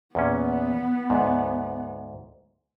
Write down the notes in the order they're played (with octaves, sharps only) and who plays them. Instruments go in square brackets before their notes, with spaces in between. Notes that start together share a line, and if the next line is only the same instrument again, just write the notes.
[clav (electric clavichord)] E2 A#2 C#4 [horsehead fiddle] B3
[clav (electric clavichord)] D2 G#2